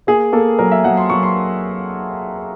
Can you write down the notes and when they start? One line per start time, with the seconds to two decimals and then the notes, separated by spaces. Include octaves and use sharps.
0.07 A#3 G#4
0.33 A#3 A4
0.59 F#3 A#4
0.72 E5
0.84 F#3 F#5
0.97 C6
1.10 F#3 C#6
1.23 C6